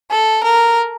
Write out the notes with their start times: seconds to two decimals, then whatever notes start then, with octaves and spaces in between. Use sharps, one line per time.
0.11 A4
0.43 A#4